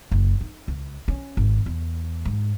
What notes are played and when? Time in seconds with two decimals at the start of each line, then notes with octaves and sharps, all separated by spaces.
0.11 F#1
0.41 D#4
0.68 C#2
1.08 C#4
1.37 G#1
1.66 E2
2.25 G#2